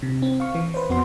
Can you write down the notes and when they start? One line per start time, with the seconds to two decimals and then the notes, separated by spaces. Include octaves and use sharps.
0.02 C3
0.22 C4
0.40 F5 C#6
0.55 E3
0.74 B4 C5
0.89 F2 B3 F#4 C6